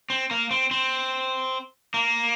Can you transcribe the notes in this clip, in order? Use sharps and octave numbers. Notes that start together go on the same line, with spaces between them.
C4
A#3
C4
C4
A#3